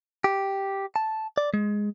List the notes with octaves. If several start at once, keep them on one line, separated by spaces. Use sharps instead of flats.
G4
A5
D5
G#3